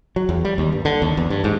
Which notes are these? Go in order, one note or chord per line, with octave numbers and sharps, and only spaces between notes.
F#3
E2
G3
D#2
G2
D3
D#2
E2
G2
G#2